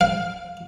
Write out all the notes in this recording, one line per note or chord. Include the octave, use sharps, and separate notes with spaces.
F5